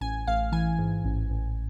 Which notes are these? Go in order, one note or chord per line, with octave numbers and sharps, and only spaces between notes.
A1 G#5
A1 F5
E3 G#5
G#2
A1
A1